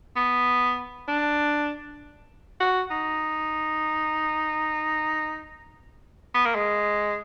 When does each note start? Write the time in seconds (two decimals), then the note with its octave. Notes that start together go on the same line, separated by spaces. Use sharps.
0.17 B3
1.08 D4
2.61 F#4
2.91 D#4
6.35 B3
6.46 A#3
6.55 G#3